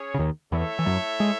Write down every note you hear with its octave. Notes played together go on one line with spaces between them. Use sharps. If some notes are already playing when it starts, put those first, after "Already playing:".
Already playing: C#4 G#4 C#5
C#3
D#2 D#3
E2 E3 A3 E4 A4 C#5 E5
E3
F#2 F#3
G#3